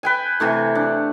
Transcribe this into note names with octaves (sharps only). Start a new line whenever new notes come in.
B4 G5 G#5
C3 E3 A3
D4